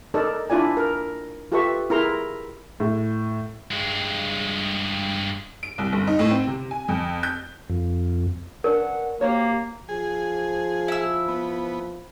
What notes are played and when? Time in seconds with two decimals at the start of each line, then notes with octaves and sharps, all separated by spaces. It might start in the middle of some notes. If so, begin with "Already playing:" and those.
0.14 D#4 A4 A#4 D5
0.50 D4 E4 F4 D5 G#5
0.77 A#4
1.52 F4 G4 A4 B4 E5 C#6
1.90 E4 G#4 A#4 A#5 C6
2.80 A2
3.71 G2 G#3
5.63 D7
5.78 C2
5.92 G1
6.07 D#4
6.19 A2
6.30 C4
6.47 C3
6.71 G#5
6.88 F2
7.23 G6
7.70 F2
8.64 C#4 D4 A#4 B4 F#5
9.21 A#3 F#4 G4 C5 C#5
9.89 F3 G#4
10.88 E4 E6
11.28 B3